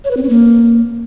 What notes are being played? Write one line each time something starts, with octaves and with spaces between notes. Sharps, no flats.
C#5
B4
C4
C#4
A#3